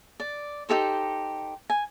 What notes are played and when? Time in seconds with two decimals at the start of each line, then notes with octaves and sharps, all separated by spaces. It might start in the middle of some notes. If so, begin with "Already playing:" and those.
0.20 D5
0.69 D#4 G4 A4 C5
1.70 G#5